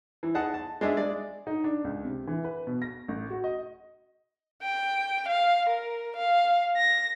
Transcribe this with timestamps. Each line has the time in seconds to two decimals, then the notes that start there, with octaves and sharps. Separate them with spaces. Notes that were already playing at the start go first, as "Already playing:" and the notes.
0.23 E3
0.35 D#4 G#4 F#5 A5
0.54 A5
0.81 G#3 D4 G#4 E5
0.97 G#3 D5
1.47 D#4
1.64 D4
1.84 C#2
2.05 C3
2.27 E3
2.44 B4
2.67 B2
2.82 A#6
3.08 A1
3.30 F#4
3.44 D#5
4.62 G5
5.28 F5
5.69 A#4
6.17 F5
6.77 A#6